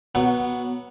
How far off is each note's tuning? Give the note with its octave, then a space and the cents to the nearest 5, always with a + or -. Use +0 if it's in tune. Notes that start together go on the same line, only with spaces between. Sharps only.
F#3 +0 B3 -15